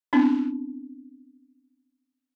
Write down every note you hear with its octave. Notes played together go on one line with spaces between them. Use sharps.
B3 C4 D4 E4